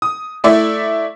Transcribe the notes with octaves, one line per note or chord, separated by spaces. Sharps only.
D#6
A3 E4 D5 E5